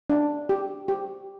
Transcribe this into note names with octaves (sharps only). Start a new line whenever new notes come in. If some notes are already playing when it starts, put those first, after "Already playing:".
D4
G4
G4